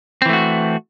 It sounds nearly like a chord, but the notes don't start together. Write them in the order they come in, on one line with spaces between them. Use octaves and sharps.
C4 E3 A3 F#4